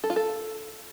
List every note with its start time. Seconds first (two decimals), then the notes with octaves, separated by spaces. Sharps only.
0.04 A4
0.10 F4
0.16 A4